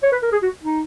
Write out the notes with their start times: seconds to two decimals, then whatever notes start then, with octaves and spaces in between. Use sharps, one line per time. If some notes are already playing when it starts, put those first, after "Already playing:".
0.03 C#5
0.12 B4
0.22 A#4
0.32 G#4
0.42 F#4
0.63 D#4